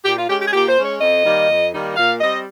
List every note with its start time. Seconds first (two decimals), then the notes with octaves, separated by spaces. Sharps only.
0.05 A#2 G4
0.18 F4
0.30 G#3 C#4 G4
0.42 G4
0.48 G#4
0.53 A#2 G4
0.69 C5
0.78 G#3 C#4
0.85 C#5
1.01 F2 D#5
1.25 D#3 G3 A#3 D#4
1.49 F2
1.73 D#3 G3 A#3 D#4
1.96 A#2 F5
2.20 G3 C4 D#5